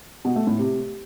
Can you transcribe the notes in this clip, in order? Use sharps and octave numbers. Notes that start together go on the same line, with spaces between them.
B2
A3
A2
C3